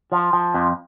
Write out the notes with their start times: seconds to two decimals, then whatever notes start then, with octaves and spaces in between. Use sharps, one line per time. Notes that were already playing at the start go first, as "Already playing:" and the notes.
0.12 F3
0.33 F3
0.54 F2